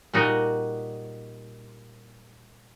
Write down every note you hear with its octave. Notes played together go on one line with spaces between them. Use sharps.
A#2 G3 D#4 F#4 D5 D#5